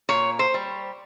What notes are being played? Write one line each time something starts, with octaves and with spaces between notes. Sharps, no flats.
A#2 C#5
C5
G3